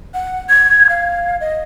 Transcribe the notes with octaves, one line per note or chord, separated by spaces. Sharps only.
F#5
G#6
F5
D#5